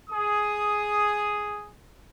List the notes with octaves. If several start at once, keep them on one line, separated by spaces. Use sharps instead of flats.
G#4 D#6